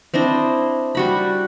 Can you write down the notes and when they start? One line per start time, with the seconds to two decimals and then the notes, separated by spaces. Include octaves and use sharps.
0.14 C4 D4 E4 D#5
0.95 G3 F#4 B5